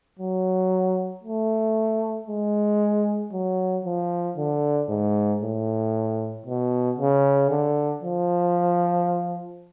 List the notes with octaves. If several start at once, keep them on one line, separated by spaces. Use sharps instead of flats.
F#3
A3
G#3
F#3
F3
D3
G#2
A2
B2
C#3
D3
F3